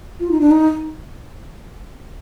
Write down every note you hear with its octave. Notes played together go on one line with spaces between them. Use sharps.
F4
D#4
D4
D#4